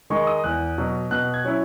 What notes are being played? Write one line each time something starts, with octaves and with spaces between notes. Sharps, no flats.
D#3 G#3 D#4 C#6
D#6
E2 F#6
B2 F#3
B2 F#6
G#6
F#3 C#4 E4